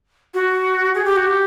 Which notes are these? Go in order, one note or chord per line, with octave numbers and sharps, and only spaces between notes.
F#4
G#4
G4
F#4
G4